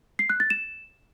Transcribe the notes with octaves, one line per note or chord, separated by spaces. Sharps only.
C7
F#6
A6
E7